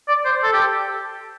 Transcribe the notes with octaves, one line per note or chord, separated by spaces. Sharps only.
D5
C5
A4
G4